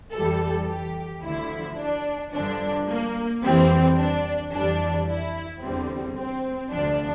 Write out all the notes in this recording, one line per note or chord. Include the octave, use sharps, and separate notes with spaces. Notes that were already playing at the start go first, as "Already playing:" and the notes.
F2 E3 G3 A4
G4
D2 D3 F3 E4
D4
G2 D3 F3 D4
A#3
F2 E3 G3 C4
D4
F2 E3 G3 D4
E4
E2 D3 G3 C4
C4
D2 C3 F3 D4